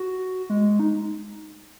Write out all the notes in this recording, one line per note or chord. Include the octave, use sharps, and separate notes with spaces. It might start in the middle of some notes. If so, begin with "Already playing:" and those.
Already playing: F#4
G#3
D#4